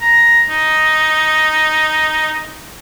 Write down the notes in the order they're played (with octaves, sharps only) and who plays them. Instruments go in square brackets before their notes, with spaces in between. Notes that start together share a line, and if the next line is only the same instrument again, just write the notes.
[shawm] A#5
D#4